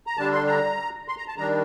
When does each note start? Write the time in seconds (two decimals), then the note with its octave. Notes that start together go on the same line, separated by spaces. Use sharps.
0.07 A#5
0.17 D3 G3 D4 A5
0.32 C6
0.47 A#5
1.08 C6
1.18 A#5
1.28 A5
1.37 D#3 G3 D4 A#5